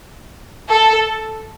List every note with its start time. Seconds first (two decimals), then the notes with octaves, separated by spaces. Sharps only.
0.69 A4